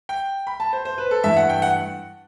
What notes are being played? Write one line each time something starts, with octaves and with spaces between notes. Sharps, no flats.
G5
B5
A5
C5
C5
B4
A4
G2 E3 A3 E5
F#5
G5
F#5